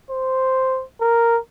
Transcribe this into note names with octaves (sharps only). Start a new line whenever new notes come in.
C5
A#4